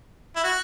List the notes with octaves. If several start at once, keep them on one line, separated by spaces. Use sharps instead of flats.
E4
F#4